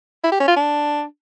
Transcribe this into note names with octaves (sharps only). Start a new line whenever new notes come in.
E4
G4
C#4
F4
D4